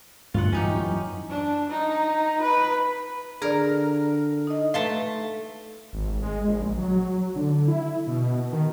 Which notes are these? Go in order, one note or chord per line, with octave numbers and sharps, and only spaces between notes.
G2 A#2 D3 F4 F#5
E3 C#4 D#4 G4
F#2 E3
D4
D#4
B4
D3 G#4 A#4 D5
D#4 D#5
A3 B4 F5 A5 C6
G#1
G#3
A#1
F#3
D3
E4
B2
D#3